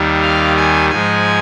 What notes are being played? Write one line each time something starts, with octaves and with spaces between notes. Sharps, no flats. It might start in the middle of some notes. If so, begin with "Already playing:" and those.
Already playing: D#2 D#3 G3
F5
G#5
G#2 F3 G#3 G#5